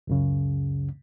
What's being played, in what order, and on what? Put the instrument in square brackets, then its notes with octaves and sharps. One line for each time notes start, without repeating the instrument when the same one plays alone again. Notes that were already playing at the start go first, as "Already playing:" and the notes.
[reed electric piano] C#2 F#2 C#3